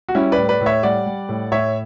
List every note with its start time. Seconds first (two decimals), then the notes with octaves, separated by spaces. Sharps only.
0.09 F#4
0.15 G3 C#4 E4
0.32 B4 D5
0.38 A2
0.49 B4 D5
0.61 A2
0.66 C#5 E5
0.83 G3 D5 F#5
1.06 G3
1.29 A2
1.52 A2 C#5 E5